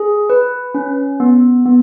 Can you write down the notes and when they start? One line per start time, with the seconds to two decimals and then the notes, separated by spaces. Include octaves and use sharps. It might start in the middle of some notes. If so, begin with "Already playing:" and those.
Already playing: G#4
0.30 B4
0.74 C#4
1.20 B3
1.66 B3